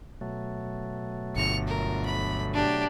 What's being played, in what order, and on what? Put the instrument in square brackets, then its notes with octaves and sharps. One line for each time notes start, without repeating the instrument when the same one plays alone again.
[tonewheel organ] B2 F#3 A3
[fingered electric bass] G1 [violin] C#7 F7
[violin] A#4
B5
D4 G4